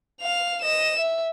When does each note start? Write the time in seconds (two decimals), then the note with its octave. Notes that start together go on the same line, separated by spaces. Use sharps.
0.21 F5 F7
0.62 D#5 E7
0.99 E5